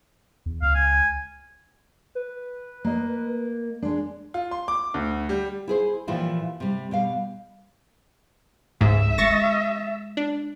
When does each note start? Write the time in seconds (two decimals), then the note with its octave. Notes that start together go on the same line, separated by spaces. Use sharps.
0.46 E2
0.62 C#2 F5
0.75 G#5
2.15 B4
2.85 A#3 D#5
3.82 G#3 D4
4.34 F4
4.51 C6
4.68 D6
4.94 D2
5.29 G3
5.68 E4 G#4 C5
6.07 A#2 E3 F3 E4 F4 G4
6.60 C3 G3
6.91 B2 G3 F5
8.81 C#2 G#2 E5
9.18 G#3 C#6 A6 A#6
10.17 D4